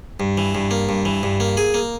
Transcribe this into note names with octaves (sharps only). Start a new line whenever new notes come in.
G2
E3
G2
A#3
G2
E3
G2
A#3
G#4
A#3